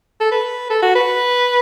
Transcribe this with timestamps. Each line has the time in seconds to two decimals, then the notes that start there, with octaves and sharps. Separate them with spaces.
0.21 A4
0.32 B4
0.70 A4
0.82 F#4
0.95 B4